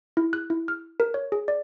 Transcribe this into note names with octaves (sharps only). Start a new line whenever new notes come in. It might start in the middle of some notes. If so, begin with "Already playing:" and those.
E4
F#6
E4
F6
A#4
C#5
G#4
D5